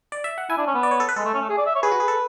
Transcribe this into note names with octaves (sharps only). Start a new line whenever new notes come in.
D5
E5
F#5
E4 G#5
D4
C#4
B3
D5
C#5
A4
B4
G#3 A4
A3
C#4
A3
G#4
D5
E5
C#5
G#4 B4
F#4
G#4
A4